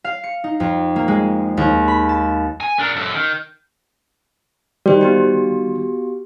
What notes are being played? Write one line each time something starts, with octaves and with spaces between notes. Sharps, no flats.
F5
C#7
D#4
F2
A#3
G#3
D#2
B5
A5
G#5
D4 A#4
F#2 A4
D#3
D#3 G3 F#4 C5
B3 F#4 G4